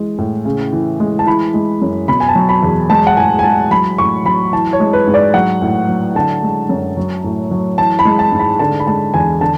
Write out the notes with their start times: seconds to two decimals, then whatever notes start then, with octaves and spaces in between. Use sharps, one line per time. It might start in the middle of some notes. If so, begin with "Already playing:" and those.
Already playing: E3 G#3
0.18 A2
0.45 C#3
0.73 E3
1.00 G#3
1.19 A5
1.27 E3 B5
1.54 G#3
1.82 F#2
2.08 B2 B5
2.20 G#5
2.29 A5
2.35 F#3
2.49 B5
2.63 E2
2.90 G#3 A5
3.07 F#5
3.17 A2 G#5
3.39 G#5
3.44 G#3 A5
3.71 F#3 B5
3.98 A2 C#6
4.25 F#3 B5
4.53 E3 A5
4.73 C#5
4.80 G#3
4.93 B4
5.07 G#2
5.14 D5
5.34 F#3 F#5
5.62 A2
5.88 F#3
6.15 D3 A5
6.43 G#3
6.69 F#2
6.97 F#3
7.24 A2
7.51 F#3
7.78 E3 A5
7.99 B5
8.05 G#3
8.19 A5
8.32 G#2
8.39 B5
8.59 D3 A5
8.80 B5
8.87 G#3 A5
9.14 E2 G#5
9.41 D3 A5